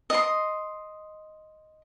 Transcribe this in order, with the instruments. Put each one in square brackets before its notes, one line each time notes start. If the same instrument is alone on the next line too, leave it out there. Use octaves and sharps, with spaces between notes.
[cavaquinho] D#5 C6